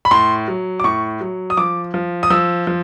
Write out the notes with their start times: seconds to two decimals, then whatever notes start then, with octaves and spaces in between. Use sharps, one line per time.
0.05 B5
0.11 A2 C6
0.48 F#3
0.80 D6
0.84 A2 C#6
1.21 F#3
1.50 D#6
1.57 F3 D6
1.94 F3
2.23 D#6
2.30 F3 E6
2.67 F3